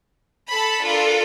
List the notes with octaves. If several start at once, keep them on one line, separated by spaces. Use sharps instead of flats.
A4 A5 B5
D4 F4 A4 A#4